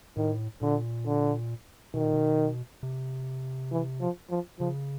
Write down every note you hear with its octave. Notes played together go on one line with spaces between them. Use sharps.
A2 D#3
A#2 D3
D3
B2 D#3
A#2
B2
C3
E3
F3
F3
C#3 F3